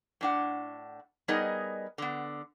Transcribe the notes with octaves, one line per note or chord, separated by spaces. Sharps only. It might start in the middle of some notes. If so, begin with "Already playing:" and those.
A2 D4 F#5
G3 B3 D#4 G#4 A#4 D#5
D3 B3